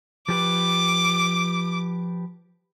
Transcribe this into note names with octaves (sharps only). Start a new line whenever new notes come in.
F3 G4 B4 D6